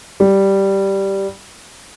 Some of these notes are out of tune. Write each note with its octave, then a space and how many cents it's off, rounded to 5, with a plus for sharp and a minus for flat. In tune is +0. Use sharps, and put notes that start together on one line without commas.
G3 -5